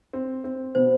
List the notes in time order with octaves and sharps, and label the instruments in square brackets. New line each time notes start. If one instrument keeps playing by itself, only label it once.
[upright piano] C4
C4
[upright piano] B2 [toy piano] C5